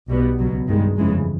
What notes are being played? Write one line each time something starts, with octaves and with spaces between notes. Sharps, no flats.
B1 B2 G3 B3
C#2 B2 F#3
G2 D#3 G#3
G1 F2 C#3 E3 G#3